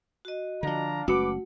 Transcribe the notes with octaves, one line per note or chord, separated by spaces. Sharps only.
F#4 D#5
D3 F3 D4 F5 A#5
F#1 G#3 A3 C#4 F#4 B4 F#5 D6